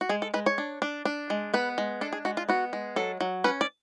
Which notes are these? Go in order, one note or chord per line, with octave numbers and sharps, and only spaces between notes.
F#4
G#3 G#4
A4
G#3 B4
C#5
D4
D4
D4
G#3
B3 B4
G#3
D4 A4
G#4
G#3 F#4
F4
B3 F#4
G#3
F#3 A4
F#3
C#4 B4
D5